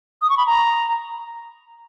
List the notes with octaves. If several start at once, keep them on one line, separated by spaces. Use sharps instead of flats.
D#6
C#6
B5
A#5